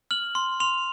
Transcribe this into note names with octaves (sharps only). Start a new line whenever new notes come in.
F6 F#7
C6
C6 F7